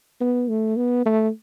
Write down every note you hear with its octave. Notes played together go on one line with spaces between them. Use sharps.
B3
A3
B3
A3